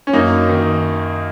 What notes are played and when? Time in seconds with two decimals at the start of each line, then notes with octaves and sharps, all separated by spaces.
0.07 C#4
0.13 F#2 A#3 D#4
0.49 D#3